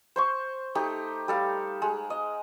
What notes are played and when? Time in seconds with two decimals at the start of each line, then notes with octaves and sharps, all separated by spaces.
0.16 C5 C6 C#6
0.75 A3 D#4 G4
1.28 G3 A4 F5
1.82 G#3
2.10 D#5